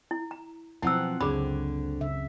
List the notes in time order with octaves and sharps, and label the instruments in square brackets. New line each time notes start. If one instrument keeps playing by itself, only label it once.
[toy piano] E4
A#5
[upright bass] B2 [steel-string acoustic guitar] F3 [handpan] F#3 C4 F#5 [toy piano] E4 E6
[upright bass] C#2 F#2 [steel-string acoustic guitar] D3 [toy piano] G#4 B5 [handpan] C#5
[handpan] C#3 E5